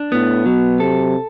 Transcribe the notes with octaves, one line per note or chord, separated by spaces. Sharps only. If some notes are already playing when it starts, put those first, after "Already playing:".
Already playing: D4
A2 B3
B2 F#3
C3 A4